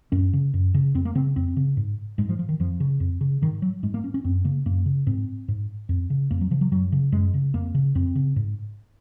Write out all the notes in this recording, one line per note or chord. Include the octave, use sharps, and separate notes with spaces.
F#2 C#4
C#3
F#2
C#3
F2 C4
A#3
C#3 C4
F2 C4
C#3
G#2
G#2 G#3
F3
F3
D#3
F2 F3
C#3
F2
C#3
G#2 D#3
F#3
G#2 G#3
A#3
C#4
C#4
F#2 C4
C#3 A#3
F#2 A#3
C#3
G#2 C4
G#2
F2
C#3
F2 A#3
F#3
C#3 F3
F#3
F#2 F#3
C#3
F#2 G#3
C#3
F2 A#3
C#3
F2 C4
C#3
G#2